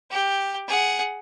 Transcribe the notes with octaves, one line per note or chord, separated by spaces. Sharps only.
G4 G5
G#4 F#5